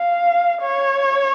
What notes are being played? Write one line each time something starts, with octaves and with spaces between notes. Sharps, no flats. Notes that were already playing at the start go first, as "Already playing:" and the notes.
Already playing: F5
C#5